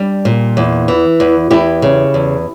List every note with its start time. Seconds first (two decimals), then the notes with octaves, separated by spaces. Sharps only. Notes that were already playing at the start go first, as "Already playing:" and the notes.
Already playing: G3 D4
0.25 A#2
0.57 E2
0.88 E3
1.20 E2
1.51 E2 E4 G4
1.82 C#3
2.14 E2